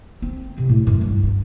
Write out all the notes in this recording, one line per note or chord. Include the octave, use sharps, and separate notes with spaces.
C4
C3
A2
F#2
G2
G2